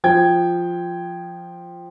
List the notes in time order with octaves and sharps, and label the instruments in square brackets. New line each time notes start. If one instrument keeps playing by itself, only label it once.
[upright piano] F3 G5 G#6